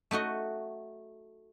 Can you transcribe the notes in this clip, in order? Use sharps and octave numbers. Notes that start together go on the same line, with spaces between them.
A3 D#4 F#4 D#5